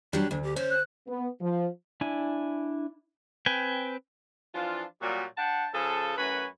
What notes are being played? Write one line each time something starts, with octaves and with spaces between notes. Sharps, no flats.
F#3 G3 D4
D2 D4
G4
C#4 C5
F#6
B3
F3
D4 E4 G#5
C4 B4 G5 G#5
E3 F3 D4 F4
A#2 F#3 G3
D4 F#5 G5 A5
C#3 F3 G#4 A4
F#2 A2 F#4 B4 G#5 B5